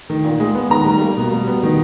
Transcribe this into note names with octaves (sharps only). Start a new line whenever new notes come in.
D#3
A#2
G#3
B3
D#3 A#5
G3
A#3
B2
G3
B3
D#3